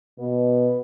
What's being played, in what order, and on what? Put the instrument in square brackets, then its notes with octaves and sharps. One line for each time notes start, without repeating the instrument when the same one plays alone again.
[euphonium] B2 [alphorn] B3